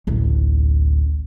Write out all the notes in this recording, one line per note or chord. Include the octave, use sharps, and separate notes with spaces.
A1 D2